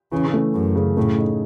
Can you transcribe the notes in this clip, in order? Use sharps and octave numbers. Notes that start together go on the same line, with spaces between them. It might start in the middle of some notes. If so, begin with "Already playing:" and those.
C#3 E3
A3
F#2 C#3
C#3
A2 A3
D#4